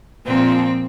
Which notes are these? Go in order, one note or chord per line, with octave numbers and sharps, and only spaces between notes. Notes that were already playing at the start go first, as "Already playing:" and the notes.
A#2 F3 C4